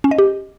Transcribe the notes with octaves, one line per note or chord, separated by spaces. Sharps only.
C#4
D#5
G4